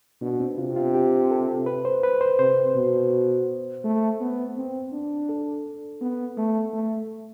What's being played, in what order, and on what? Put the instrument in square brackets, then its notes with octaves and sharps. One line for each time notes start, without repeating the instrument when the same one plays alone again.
[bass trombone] B2 [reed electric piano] D4
[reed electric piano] C4
[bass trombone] C3 [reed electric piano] F4
[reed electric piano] F4
G4
A4
B4
C5
B4
C5
[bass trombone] C3 [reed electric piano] C5
[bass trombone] B2
A3
B3
C4
D4
[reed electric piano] A4
[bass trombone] B3
A3
A3